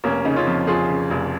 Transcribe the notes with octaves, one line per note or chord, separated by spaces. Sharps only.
F1 A#3 C#4
C#3 D#4
C#4 F4
F2
F2 F4 G#4
C#3
F1